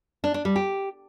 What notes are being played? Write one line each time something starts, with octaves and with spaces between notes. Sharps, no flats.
D4
D4
G3
G4